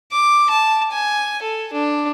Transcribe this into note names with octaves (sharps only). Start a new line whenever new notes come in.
D6
A5
G#5
A4
D4